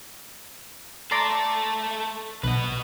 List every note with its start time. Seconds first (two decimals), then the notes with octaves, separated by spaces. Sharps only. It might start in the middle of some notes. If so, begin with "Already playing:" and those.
1.11 A3 A4 D5 A#5 C6
2.43 B1 B4 D#5